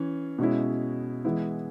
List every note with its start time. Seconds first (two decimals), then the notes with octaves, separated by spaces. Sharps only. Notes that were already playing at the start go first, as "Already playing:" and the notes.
Already playing: E3 C#4
0.39 B2 G#3 C#4 E4
1.25 E3 G#3 B3 E4